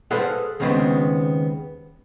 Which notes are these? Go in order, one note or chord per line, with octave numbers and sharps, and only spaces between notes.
G#4 A4 B4 C5 F5 F#5
D#2 C#3 G#3 B3 C4